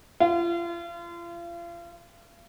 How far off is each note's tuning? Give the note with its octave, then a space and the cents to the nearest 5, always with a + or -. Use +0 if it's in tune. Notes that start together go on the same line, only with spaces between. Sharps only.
F4 -35